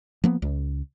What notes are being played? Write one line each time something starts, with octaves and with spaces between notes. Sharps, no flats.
F3 A#3 B3
C#2